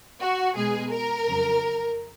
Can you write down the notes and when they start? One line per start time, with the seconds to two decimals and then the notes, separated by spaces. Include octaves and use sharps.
0.20 F#4
0.56 B2 G#3 G#4
0.91 A#4
1.26 F2 C#3 F#3